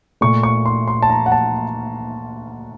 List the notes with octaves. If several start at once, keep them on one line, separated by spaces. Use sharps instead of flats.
A#2 A3 C#6
C#6
C6
C6
A5
A#5
F#5
A5